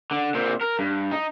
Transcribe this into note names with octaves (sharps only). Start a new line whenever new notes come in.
D3
A#2 C4
A#4
G2
D#4